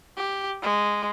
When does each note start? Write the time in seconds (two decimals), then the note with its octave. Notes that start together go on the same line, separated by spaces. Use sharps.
0.17 G4
0.62 G#3